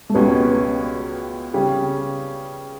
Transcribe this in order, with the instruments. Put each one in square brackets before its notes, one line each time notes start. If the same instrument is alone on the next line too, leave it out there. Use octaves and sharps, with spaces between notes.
[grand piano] A3
[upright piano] C#2 B2 G3 C#4 [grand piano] B3
[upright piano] C#3 G3 C#4 G4